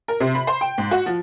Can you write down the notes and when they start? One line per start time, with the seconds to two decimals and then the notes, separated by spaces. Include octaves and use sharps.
0.08 A#4
0.20 C3
0.35 B5
0.47 C5
0.61 G5
0.78 G#2
0.91 F#4
1.06 F3